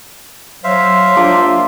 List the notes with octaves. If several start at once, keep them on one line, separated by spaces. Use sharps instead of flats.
F#3 C5 E5 F5
A#3 D4 F4